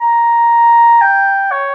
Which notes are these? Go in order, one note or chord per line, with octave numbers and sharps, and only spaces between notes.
A#5
G5
C#5